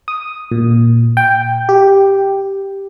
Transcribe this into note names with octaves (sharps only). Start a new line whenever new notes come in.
D#6
A#2
G5
G4